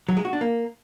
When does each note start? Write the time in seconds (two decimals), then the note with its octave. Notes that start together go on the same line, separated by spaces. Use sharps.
0.09 F#3
0.17 G#3
0.25 F#4
0.33 D4
0.41 A#3